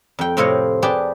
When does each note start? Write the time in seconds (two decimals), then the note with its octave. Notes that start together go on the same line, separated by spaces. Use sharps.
0.19 F2 G5
0.37 A2 C3 C4 F4 C#5 D#5
0.82 G4 G#4 B4 D5 G5 A5